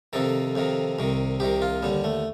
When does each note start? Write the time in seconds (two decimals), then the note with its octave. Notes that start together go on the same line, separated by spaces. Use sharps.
0.13 F2 C3 D#3 A4
0.55 F2 C3 D#3
0.99 C2 C3 D#3
1.40 C2 C3 D#3 G4
1.62 F4
1.83 D#2 D3 G3
2.04 A3